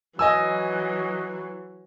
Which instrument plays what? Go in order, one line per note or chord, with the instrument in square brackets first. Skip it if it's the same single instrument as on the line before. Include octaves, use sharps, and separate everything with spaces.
[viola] E3 F#3 [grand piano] D#5 G#5 E6